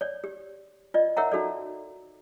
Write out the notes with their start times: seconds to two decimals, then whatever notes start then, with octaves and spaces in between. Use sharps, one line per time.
0.01 C#5 D5
0.24 G4
0.94 F4 D5 D#5
1.17 A#4 C#5 E5 F#5 A#5
1.32 D#4 F#4 A4 D5